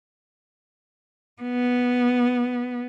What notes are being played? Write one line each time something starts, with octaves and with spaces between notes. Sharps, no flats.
B3